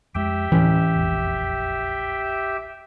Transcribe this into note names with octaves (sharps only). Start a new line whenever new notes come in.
F2 G#3 G4 E5 G5
D1 A2 E3 C#4
E1 A#1 F2